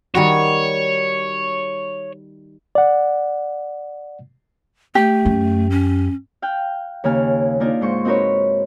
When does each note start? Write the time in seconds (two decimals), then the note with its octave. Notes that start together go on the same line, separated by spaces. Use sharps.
0.15 D#3 G3 F#4 C#5
2.75 D5 F#5
4.95 A3 G4
5.25 F#2
5.70 C#4
6.42 F5 G5 F#6
7.04 D#2 C#3 A#3 G#5 F6
7.60 A#3 D4 D#4 F4 A#4
7.81 G#2 C5 C#6
8.05 C4 D#4 F#4 A#4 B4 C#5